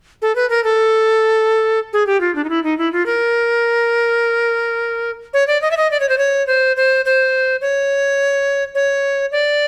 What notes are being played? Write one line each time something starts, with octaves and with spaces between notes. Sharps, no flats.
A4
B4
A#4
A4
G#4
G4
F4
D4
D#4
E4
D#4
E4
F4
A#4
C#5
D5
D#5
E5
D#5
D5
C#5
C5
C#5
C5
C5
C5
C#5
C#5
D5